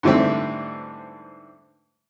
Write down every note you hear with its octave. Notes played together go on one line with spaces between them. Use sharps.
G#2 D3 E3 G3 A3 C4